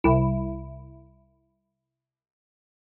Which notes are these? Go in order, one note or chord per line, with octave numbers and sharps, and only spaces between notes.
C2 E4